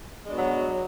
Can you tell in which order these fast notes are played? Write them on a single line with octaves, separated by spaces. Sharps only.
G#3 D4 B2 F#3